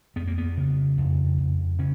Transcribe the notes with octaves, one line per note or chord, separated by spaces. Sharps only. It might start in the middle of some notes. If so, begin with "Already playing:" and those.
F2 B3
A#3
B3
C#3
F2
F2
C#3 C#4